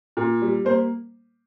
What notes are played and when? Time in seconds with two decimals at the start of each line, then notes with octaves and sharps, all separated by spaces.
0.17 A#2
0.42 G3
0.65 A#3 C5